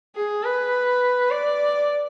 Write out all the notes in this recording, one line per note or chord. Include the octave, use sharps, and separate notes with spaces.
G#4
B4
D5